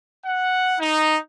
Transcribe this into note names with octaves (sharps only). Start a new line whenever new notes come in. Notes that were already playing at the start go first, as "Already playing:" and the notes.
F#5
D#4